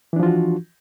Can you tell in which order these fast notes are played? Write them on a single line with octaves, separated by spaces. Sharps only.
E3 D4 F3 F4 F#4